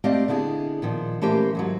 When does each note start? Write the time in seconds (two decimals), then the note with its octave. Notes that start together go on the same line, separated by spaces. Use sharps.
0.04 A3 C4 G4 D5 D#5 F5
0.28 D3 B3 E4 G#4
0.82 A#2 D#3 F3
1.22 E3 A3 A#3 C#4 G4 C5
1.55 D#2 G#2 F#3